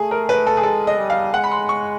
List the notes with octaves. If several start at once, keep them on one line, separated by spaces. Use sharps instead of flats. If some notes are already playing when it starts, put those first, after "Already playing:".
Already playing: A3 G#4
A#4
B4
A4
G#4
G#3 A4
D#5
G3
F5
G#3 F#5
B5
C6
C#6